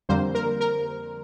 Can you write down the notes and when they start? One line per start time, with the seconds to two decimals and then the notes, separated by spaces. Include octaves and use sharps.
0.09 F2 D3 G3 A#3 C5
0.35 A#4
0.60 A#4